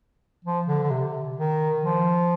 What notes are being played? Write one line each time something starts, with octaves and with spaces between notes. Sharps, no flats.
F3
D3
D3
C3
D#3
F3